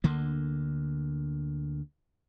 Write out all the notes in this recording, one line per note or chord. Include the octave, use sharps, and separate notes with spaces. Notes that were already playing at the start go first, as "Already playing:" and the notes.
D2 D3 A#3